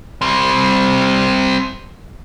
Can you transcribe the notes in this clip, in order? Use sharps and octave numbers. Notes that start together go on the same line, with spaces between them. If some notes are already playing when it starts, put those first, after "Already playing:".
G3 C4